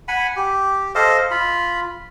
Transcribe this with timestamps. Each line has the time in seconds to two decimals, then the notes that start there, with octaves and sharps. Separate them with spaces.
0.08 F#5 G#5 B5
0.36 G4
0.95 A4 C5 D#5 F5
1.31 F4 B5